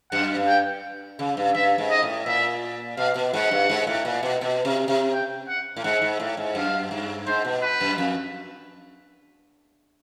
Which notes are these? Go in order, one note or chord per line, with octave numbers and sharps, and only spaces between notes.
F#2 F#5
G2
G5
C#3
G2
G2 E5
G#2
D#5
A2
A#2 E5
B2 F5
B2
G#2 F#5
G2
G#2
A2
A#2
B2
B2
C3
C3
G5
F#5
A2
G#2 F#5
G#2
A2
G#2
F#2 F5
G2
G#2 C5
B2
B4
F#2
F2